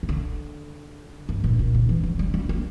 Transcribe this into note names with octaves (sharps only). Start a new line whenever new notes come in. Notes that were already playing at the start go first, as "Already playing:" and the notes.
C#3
D3
G2
A#2
A#2
D3
E3
F#3
G3
G3
A#3